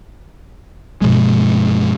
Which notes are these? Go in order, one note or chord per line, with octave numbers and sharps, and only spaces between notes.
G2 B2 F3 G#3